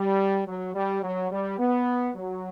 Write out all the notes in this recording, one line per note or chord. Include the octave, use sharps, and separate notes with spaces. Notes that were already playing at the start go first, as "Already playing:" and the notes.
Already playing: G3
F#3
G3
F#3
G3
B3
F#3